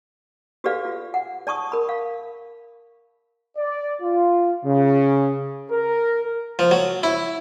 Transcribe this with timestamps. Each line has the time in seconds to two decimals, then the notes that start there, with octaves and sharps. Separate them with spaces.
0.64 F#4 G4 A4 B4 D5 F5
0.85 F4
1.14 F#5
1.47 D5 A5 C#6 D#6
1.72 A#4 B5
1.89 F5
3.57 D5
4.02 F4
4.65 C#3
5.70 A#4
6.59 F3
6.71 F#3
7.03 E4